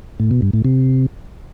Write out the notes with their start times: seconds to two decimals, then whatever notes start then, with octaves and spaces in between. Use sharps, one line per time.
0.20 A2
0.31 B2
0.42 G2
0.53 A2
0.65 C3